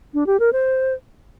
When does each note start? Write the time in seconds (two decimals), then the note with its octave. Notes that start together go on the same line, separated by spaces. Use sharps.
0.14 D4
0.26 G4
0.40 A#4
0.53 C5